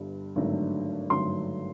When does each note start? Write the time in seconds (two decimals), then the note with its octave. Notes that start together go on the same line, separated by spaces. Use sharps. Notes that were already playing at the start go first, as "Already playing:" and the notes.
Already playing: G1 G2 D3 G3
0.36 G#1 G2 D3 F#3 A3
1.09 G#1 G2 D3 F#3 A3 C6